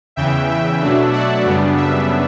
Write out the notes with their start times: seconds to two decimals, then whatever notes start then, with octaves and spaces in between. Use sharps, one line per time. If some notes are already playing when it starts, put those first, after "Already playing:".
0.16 E2 C#3 E3 E5 G5
0.49 E5
0.80 B2 F#3 A3 D4
1.12 D5 F#5
1.45 F#2 C#3 G3 B3 D4
1.77 E5